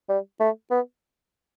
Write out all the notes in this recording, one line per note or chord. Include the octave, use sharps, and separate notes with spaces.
G3
A3
B3